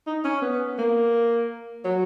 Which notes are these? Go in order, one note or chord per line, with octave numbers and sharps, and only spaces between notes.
D#4
C#4
B3
A#3
F#3